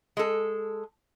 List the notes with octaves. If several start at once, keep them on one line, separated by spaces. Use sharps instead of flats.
G#3 A4